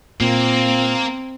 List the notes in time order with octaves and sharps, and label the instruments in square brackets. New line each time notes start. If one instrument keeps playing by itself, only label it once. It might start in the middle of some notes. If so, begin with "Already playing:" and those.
[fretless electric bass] A#2 [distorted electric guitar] A#3 [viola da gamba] C4